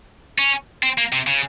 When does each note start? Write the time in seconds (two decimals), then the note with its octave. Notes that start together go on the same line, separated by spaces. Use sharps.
0.38 C#4
0.83 C4
0.98 A#3
1.12 C3
1.27 C#3